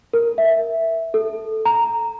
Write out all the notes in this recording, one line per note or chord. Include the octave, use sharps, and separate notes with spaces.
A#4
E5
A4
A#5